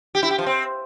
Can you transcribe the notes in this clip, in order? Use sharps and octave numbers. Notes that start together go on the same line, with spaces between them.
G4
E4
G4
F3
C4